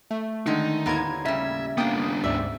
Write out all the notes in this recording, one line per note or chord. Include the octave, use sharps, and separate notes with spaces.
A3
D3 D#3 G#3 D#4
D#2 A2 B3 F4 A#4 G#6
C#3 G3 E5
A#3 B3 D4 G5 D#6
D2 G#2 D5 E5